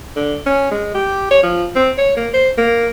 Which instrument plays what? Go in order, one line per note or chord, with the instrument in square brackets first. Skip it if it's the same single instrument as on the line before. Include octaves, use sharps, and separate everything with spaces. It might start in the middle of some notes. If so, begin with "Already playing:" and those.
[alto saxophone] D3
C#4
G#3
G4
C#5
F3
C4
C#5
A#3
C5
A#3